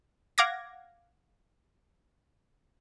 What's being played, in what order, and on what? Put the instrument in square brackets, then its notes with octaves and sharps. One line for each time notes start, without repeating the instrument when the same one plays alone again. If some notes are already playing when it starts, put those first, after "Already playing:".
[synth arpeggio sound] F5 F#5 D6 G#6 A#6